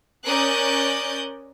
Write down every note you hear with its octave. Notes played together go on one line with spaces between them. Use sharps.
C#4 A#4 D5 D#6 F#6 G6